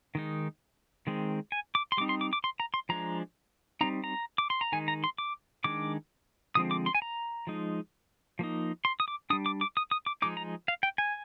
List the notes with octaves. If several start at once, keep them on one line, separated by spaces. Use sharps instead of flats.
D#3 G#3 D#4
D#3 G#3 C4
G#5
D6
C6
G3 C4 D#4 D6
C6
D6
D6
C6
A#5
C6
F3 G#3 D4 A#5
G3 C4 D#4 A#5
A#5
D6
C6
A#5
D#3 G#3 D#4 G#5
A#5
C6
D6
D#3 G#3 D4 D6
D3 F3 G#3 C4 D#6
D6
C6
G#5
A#5
F3 G#3 D#4
F3 A#3 D#4
C6
D#6
D6
G3 D4 D#6
D6
D6
D#6
D#6
D6
F3 G#3 D#4 D6
A#5
F5
G5
G#5